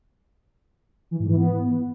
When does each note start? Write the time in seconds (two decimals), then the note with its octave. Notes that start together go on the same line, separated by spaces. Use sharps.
1.11 E3
1.19 G#2
1.28 E3
1.36 B3